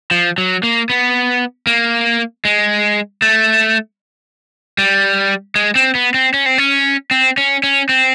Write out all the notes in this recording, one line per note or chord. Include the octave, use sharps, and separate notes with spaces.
F3
F#3
A#3
B3
A#3
G#3
A3
G3
G#3
C4
B3
C4
C#4
C4
C#4
C4
C#4
C#4
C4